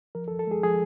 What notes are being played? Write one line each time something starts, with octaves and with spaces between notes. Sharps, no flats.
F3 A#4
A4
F3
A4
G#3 G#4
F3 G#4